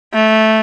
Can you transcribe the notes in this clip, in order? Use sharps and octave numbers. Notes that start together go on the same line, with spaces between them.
A3